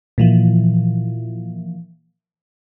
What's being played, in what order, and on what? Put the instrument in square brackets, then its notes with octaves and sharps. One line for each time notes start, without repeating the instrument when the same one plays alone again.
[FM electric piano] A#2 E3 F3